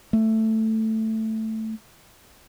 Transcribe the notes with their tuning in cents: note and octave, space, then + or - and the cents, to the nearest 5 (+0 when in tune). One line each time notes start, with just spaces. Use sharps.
A3 +5